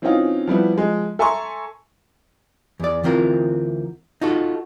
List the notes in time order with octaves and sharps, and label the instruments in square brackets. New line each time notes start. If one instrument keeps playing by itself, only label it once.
[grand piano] E3 C4 C#4 D#4 F4
F3 G3 B3 E4
F3 G#3
A4 E5 G#5 A#5 C6 C#6
[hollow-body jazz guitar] E2 D5
D2 E3 C4 F4 A#4
D#4 F4 F#4 A4